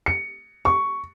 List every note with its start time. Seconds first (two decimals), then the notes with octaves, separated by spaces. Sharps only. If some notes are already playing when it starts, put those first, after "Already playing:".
0.06 C#7
0.65 C#6